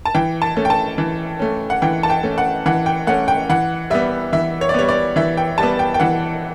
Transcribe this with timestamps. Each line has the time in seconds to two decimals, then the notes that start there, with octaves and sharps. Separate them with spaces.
0.05 A5
0.15 E3 G5
0.42 A5
0.56 A3 C#4
0.65 G5
0.70 A5
0.98 E3
1.39 A3 C#4
1.70 F#5
1.82 E3 G5
2.03 A5
2.10 G5
2.23 A3 C#4
2.38 F#5
2.66 E3 F#5
2.86 G5
3.07 A3 C#4 F#5
3.28 G5
3.50 E3 F#5
3.90 G3 B3 E5
4.33 E3 E5
4.61 C#5
4.69 D5
4.74 G3 B3 C#5
4.89 D5
5.16 E3 E5
5.37 G5
5.58 G3 B3 A5
5.79 G5
5.94 G5
6.00 E3 F#5